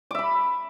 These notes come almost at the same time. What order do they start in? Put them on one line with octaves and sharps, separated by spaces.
D6 E5 B5